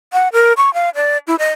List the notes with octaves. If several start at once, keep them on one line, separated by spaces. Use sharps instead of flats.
F#5
A#4
C#6
F5
D5
E4
D#5